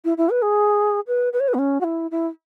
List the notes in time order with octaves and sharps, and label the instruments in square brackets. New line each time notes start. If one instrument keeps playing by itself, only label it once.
[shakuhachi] E4
E4
B4
G#4
B4
B4
C#5
B4
B3
C#4
F#4
E4
E4